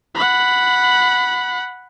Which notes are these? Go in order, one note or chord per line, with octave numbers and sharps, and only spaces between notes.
F#5 B5